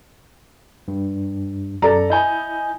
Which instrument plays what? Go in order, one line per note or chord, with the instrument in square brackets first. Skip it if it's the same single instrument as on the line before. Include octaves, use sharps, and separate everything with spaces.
[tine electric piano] G2
[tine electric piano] F#2 [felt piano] A4 D5 A#5
[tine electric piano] E4 G6 [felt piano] D#5 G#5